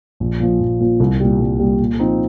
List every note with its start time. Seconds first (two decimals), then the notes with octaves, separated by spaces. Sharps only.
0.20 A#1
0.40 A#2 F3
0.61 A#1
0.80 A#2 F3
1.00 C2
1.20 A#2 G3
1.40 C2
1.59 A#2 G3
1.79 A#2
1.99 F3 C4 D#4